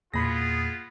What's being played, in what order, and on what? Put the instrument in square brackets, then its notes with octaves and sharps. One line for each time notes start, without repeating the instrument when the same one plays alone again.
[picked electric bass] E2 A#2 A#3 [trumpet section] B3 F4 [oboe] G#4 [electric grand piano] B5 A#6